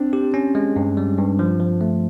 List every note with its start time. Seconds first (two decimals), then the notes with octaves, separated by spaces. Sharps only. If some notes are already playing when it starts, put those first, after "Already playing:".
Already playing: C4 D4
0.13 G4
0.34 C#4
0.55 G#3
0.76 G2
0.97 G3
1.18 G2
1.39 F3
1.60 F3
1.81 A3